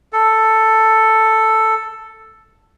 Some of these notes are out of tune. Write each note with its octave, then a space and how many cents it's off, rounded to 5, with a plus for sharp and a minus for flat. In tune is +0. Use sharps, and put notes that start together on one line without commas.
A4 +5